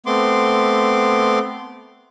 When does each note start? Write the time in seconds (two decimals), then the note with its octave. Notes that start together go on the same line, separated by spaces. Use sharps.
0.06 A3 B3 C4 C6 D6